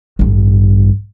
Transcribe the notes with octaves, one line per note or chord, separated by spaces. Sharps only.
A1 G2